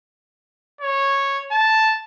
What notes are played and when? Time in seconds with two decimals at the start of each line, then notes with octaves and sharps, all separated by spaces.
0.81 C#5
1.52 A5